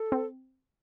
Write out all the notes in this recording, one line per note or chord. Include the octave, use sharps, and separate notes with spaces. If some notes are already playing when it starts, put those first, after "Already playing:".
Already playing: A4
C4